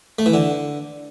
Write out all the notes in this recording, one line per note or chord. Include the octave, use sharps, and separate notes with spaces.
A3
E3
D3